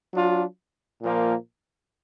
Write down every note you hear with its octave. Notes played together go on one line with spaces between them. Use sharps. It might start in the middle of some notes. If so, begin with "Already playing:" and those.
F#3 D4 F4
A#2 F3 A#3